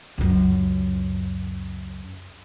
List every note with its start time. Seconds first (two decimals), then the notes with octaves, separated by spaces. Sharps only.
0.18 C#2 F#2